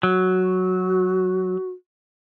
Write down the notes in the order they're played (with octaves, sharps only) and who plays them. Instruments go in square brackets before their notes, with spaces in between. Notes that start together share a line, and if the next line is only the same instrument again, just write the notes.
[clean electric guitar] F#3 [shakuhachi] F#4